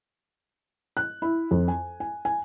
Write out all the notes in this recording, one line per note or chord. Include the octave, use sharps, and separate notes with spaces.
F#6
E4
F2
G#5
G#5
G#5